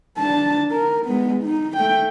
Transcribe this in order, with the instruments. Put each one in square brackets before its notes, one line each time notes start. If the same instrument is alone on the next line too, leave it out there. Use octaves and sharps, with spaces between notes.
[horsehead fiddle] D4 A5
A#4
G#3 B3
D#4
A3 G5